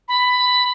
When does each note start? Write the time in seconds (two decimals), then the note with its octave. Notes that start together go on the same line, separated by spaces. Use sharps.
0.08 B5